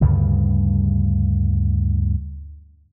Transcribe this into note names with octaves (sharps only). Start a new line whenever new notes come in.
D2 G2 C#3 G3